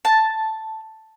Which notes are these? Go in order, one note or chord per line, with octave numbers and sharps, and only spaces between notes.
A5